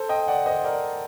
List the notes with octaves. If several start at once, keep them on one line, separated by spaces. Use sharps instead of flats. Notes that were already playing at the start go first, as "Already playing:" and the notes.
Already playing: A4 C5
D#5 G5
D5 F#5
C5 D#5
A#4 D5